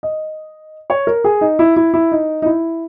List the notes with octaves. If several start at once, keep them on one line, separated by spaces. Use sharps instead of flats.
D#5
C#5
A#4
G#4
D#4
E4
E4
E4
D#4
D#4
E4